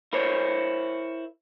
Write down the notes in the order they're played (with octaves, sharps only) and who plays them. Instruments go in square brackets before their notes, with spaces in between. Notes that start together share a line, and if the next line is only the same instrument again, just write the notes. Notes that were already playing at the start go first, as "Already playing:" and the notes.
[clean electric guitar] E4 A#4 C5 C#5